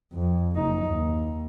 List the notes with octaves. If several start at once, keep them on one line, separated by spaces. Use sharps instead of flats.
F2
F#1 D#4
D#2